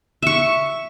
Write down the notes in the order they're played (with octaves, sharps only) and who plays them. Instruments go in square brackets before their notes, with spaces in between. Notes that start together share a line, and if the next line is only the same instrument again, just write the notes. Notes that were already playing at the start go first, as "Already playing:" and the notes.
[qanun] E5 C#6